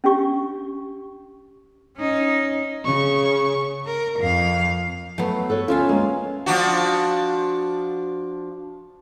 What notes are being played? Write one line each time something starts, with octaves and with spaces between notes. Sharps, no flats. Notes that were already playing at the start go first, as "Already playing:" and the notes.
C#4 D4 G4 C#6
C#4 D#4
C#3 C#6
A#4
F2 F5
F#3 A3 B3
A4 B4 C#5
D2 C#4 F4 E5 F5
G#3 A#3
F3 D4 F#4